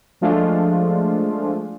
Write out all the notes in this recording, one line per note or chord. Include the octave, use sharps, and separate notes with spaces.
F3 G#3 A3 D4 F4